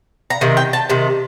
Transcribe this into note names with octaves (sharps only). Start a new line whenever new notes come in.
A#5
C3 D#3
G5
A5
C3 D#3